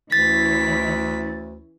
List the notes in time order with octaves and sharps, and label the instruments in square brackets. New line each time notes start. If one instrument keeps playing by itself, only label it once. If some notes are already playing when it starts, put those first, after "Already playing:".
[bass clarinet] D2 [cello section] E3 C#4 E4 [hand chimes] A6 [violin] B6